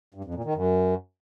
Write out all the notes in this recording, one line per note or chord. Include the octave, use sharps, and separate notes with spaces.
G2
F2
A#2
D#3
F#2